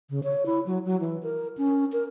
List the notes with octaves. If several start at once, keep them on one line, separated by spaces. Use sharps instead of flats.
C#3
C#5
E4
F#3
F#3
E3
A#4
C#4
A#4